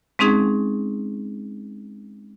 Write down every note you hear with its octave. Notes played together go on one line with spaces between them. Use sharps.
G#3 C4 C#4 D#4 G#4